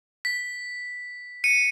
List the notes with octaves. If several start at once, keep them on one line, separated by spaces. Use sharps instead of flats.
B6
C#7 D#7